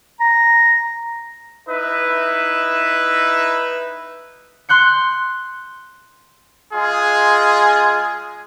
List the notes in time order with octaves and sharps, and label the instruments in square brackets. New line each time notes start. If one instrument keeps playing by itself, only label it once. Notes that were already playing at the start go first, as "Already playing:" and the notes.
[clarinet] A#5
[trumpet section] D#4 E4 B4 E5
[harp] C6 F#6 G6 C#7
[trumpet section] G#3 F4 G#4